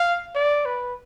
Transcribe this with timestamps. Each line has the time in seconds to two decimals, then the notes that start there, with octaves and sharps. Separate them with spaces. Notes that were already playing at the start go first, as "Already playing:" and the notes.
Already playing: F5
0.35 D5
0.66 B4